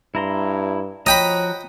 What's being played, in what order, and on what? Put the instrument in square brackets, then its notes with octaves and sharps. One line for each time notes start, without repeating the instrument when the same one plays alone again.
[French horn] G2 [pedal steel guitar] E4 A#5 C6
[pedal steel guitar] F3 F#4 A#5 [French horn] C#5 [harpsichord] D#5 G5 B5